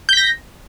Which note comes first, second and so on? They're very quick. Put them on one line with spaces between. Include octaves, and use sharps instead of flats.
G6 B6 A#6